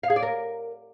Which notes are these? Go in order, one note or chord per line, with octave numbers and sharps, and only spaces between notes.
F5
G#4
D5
A#4